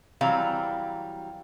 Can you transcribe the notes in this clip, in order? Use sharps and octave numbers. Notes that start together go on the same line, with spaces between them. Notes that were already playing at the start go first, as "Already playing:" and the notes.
E3 F#3 G3 C4 F5 A#5